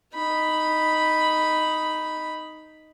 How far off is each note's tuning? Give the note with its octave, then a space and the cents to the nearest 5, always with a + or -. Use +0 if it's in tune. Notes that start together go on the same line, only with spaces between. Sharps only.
D#4 +0 B5 +0